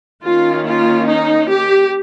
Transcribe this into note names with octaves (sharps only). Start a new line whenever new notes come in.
D#3 A#3 C#4 F4
F4
D#4
G4